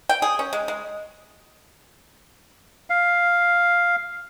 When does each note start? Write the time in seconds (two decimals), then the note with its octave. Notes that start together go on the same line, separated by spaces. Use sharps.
0.09 G5
0.22 G#4
0.39 C#4
0.53 G#3
0.68 G#3
2.90 F5